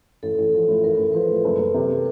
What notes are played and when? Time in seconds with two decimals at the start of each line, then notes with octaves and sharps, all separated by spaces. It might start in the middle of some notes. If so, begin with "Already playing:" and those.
0.23 A1 A4
0.38 A1
0.54 F3
0.69 A2
0.83 A1 A#4
0.99 A1
1.13 F3 B4
1.29 A2
1.45 F#1
1.58 F#1
1.74 C3